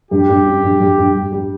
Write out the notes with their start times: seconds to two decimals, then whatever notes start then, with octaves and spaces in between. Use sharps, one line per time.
0.11 G2 G4
0.29 G2
0.46 C#4
0.64 G2
0.80 G2
0.98 G2
1.15 G3
1.32 G3